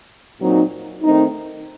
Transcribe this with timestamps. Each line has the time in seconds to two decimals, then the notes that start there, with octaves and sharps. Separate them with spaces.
0.40 A#2 F#3 C4 D#4
1.03 D#3 A3 C4 D#4